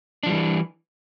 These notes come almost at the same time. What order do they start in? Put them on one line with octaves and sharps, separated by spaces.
D4 F3 G3 E3